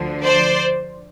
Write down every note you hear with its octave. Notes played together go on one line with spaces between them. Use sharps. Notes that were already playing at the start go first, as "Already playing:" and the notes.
Already playing: D2 D3 F3
C5 D5